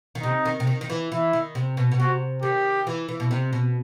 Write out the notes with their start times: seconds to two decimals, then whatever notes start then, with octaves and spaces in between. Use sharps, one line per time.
0.15 D#3
0.23 C3 D#4
0.45 D#3
0.60 C3
0.67 D#3
0.81 D#3
0.90 E3
1.12 E3 E4
1.33 D#3
1.55 C3
1.77 B2
1.91 B2
1.99 C3 F#4
2.42 D#3 G4
2.87 E3
3.09 E3
3.20 B2
3.31 C3
3.53 B2